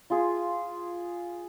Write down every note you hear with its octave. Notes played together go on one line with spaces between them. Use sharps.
F4 G#4